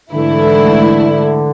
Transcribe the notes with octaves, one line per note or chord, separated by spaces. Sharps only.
G#2 D3 E3 A3 E4